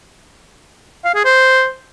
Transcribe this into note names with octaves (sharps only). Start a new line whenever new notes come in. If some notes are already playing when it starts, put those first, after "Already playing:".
F5
G#4
C5